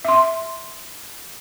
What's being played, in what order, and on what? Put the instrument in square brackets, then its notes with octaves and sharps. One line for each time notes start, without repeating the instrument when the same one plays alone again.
[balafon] E5 C6